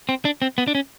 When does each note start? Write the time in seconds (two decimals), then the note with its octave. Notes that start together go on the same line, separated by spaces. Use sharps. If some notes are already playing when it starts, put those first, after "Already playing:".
0.09 C4
0.25 D4
0.42 C4
0.58 B3
0.67 D4
0.75 C#4